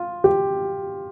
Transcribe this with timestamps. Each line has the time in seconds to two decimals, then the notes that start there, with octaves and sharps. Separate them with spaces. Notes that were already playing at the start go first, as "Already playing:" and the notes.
Already playing: F4
0.24 G4